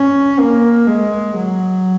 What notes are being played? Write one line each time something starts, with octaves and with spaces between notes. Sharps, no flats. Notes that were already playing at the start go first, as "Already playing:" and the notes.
Already playing: C#4
A#3
G#3
F#3